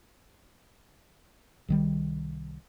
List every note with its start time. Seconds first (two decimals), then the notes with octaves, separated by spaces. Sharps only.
1.68 C2 D#3 G3